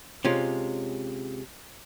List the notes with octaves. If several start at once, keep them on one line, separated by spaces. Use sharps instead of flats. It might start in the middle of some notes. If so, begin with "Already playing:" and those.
C3 G#3 C#4 F4